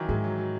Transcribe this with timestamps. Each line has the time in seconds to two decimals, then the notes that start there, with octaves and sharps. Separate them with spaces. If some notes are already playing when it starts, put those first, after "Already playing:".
Already playing: D#3 E3 F#3 E4
0.09 G#2 G#3
0.24 F#3
0.38 F#3